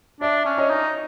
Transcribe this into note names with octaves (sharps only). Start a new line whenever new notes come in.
D4 D5 E5
C#4
C#5 D#5
D#4